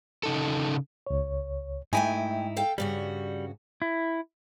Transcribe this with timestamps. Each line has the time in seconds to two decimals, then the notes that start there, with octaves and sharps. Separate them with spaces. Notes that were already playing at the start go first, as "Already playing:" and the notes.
0.23 C#3 D#4 A4
1.07 C#2 C#5
1.93 G#2 A3 D#4 E4 G5 G#5
2.56 A4 F5 G5
2.78 G2 C#3 G3 F#4
3.82 E4